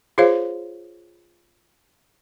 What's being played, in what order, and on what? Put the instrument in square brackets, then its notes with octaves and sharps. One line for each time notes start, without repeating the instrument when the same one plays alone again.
[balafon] F4 G#4 C5 C#5 F5